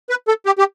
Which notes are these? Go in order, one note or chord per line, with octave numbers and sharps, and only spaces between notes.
B4
A4
G4
G4